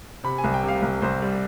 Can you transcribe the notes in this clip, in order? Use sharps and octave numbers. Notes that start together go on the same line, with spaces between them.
C3 B5
G#5
C2
G5
C3
F5
C2
C2 C5
G3